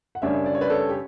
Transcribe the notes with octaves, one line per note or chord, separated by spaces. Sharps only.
F#5
F#2 C#3 G3 D4 C#5 E5
D5
C#5
B4 D5
A4 C#5
G4